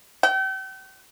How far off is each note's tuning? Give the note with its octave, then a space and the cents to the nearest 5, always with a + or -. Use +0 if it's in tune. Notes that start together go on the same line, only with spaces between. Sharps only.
G5 -40